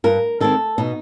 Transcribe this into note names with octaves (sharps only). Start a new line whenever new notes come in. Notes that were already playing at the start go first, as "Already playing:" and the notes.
G2 A#4
D#3 G#3 C4 A4
B2 D#4